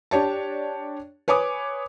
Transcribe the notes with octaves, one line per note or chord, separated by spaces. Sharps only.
D4 G4 C#5 A5
B4 C#5 G#5 D6 D#6